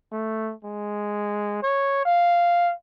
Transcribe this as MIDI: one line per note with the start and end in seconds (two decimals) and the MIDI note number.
0.12 0.53 57
0.64 1.62 56
1.62 2.03 73
2.05 2.72 77